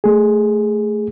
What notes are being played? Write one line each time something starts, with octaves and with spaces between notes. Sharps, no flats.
A3 G#4